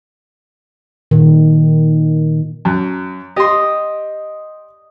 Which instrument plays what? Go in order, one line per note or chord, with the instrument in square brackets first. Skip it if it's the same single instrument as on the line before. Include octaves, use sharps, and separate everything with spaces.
[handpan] A#2 D#3
[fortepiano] F#2
[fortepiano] G4 C6 [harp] D#5